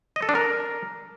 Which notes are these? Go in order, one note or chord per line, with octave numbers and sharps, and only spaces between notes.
D#5
A4
D4
A#4